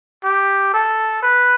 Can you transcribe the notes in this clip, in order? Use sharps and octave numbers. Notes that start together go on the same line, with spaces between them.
G4
A4
B4